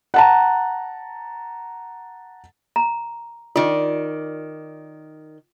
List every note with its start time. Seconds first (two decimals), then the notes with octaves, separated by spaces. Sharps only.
0.14 F#5 A5 A#5
2.76 A#5
3.56 D#3 F4 D5